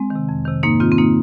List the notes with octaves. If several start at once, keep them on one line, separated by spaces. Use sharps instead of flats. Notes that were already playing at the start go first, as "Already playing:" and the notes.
Already playing: G#3 C4
D#3
C3
F2
C3 D#3
G#2 A#3 D#4
D#3 C4 F4
C4
A#3 D#4